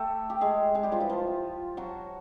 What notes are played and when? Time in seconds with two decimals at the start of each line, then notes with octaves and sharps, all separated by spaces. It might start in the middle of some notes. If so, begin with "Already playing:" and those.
Already playing: A3 G4 A4
0.30 G4
0.41 G#3 G#4
0.75 G#3 G#4
0.83 G3 G4
0.92 F3 F4
1.00 E3 E4
1.09 F3 F4
1.77 F#3 F#4